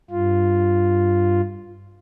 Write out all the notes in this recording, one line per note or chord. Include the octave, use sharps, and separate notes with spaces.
G2 F4